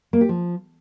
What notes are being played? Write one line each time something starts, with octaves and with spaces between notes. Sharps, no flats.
A#3
G4
F3